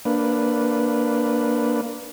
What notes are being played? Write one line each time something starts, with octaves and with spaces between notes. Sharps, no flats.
A#3 D4 B4